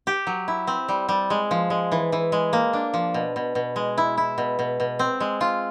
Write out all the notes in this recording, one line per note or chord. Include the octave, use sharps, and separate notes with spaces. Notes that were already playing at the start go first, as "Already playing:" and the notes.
G4
F#3
E4
C4
G3
G3
G#3
F3
G#3
E3
E3
G#3
A#3
D4
F3
B2
B2
B2
G#3
E4
E4
B2
B2
B2
C4
G#3
F4